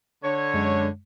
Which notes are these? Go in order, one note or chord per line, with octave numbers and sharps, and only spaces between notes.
D3 C#5
F#2 G#3